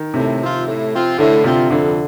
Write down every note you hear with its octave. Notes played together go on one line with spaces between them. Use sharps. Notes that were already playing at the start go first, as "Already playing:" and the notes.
Already playing: D#3
A2 C3
F3 C4 F4
A2
F3 C4 F4
A2 D3
C3 F3 C4 F4
F2 D3